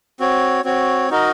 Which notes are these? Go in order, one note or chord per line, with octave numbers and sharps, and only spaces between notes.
C4 F#4 C#5
C4 F#4 C#5
D#4 F#4 A#4 D#5